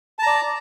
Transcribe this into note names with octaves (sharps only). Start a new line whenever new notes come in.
D5 A5 A#5